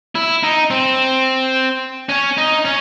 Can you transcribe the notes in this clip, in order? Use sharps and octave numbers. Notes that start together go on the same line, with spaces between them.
E4
D#4
C4
C#4
D#4
C#4